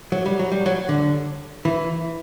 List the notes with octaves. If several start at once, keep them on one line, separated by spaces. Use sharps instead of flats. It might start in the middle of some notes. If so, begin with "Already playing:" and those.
F#3
G3
F#3
G3
F#3
D3
E3